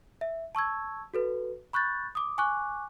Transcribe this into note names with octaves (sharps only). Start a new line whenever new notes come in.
E5
A5 C#6 E6 G#6
F#4 A4 B4
B5 C#6 F#6 G6 A6
D6 D#6
G#5 C#6 D6 F#6